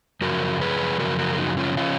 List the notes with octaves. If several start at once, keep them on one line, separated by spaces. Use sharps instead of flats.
F#2 C#3 F3 F#4 A#4
G#4 B4
F#2 C#3 F3 F#4 A#4
F#4 A#4
G#4
D#4 F#4
C#4 F4
C#3 F3 C#4 F4